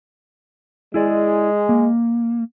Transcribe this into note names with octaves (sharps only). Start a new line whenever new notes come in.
G#3 E4 G#4 D5
A#3